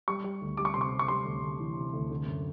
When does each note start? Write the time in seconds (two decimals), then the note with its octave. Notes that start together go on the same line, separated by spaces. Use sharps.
0.08 G3 C#6
0.24 G3
0.42 D2
0.57 G3 D6
0.65 C#6
0.74 C3 C6
0.81 C#6
0.91 C3
0.99 C#6
1.08 G3 C6
1.25 D2
1.42 D2
1.59 E3
1.77 C3
1.94 D2
2.11 D3
2.27 F#2